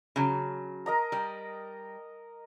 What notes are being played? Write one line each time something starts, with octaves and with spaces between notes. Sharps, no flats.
C#3 F#3
A#4 D#5 A#5
G3